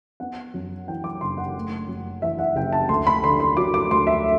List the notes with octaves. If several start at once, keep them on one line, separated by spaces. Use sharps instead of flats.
B3 F#5
F#2
E3 G5
D6
F#1 C6
F#5
A3
F#2
E3 E5
F#5
F#1 G5
A5
D2 C6
B5
D3 C6
C6
F#3 D6
D6
D2 C6
E5